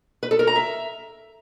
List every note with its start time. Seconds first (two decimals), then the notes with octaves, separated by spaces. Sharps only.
0.23 B4
0.31 A4
0.39 A#4
0.47 A#5
0.56 E5